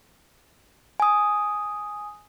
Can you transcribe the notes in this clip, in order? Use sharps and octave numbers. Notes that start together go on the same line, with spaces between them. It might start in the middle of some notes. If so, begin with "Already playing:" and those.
G#5 D#6